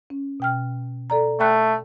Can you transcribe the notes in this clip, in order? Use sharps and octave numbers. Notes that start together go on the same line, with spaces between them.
C#4
B2 G5 F6
A4 D5 A#5
A3 G5 B5 F#6